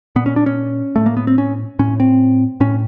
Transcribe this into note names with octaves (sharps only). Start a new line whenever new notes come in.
A#2 B3
C#4
D4
C#4
A2 A3
A#3
B3
C4
C#4
A2 C#4
C4
A2 C#4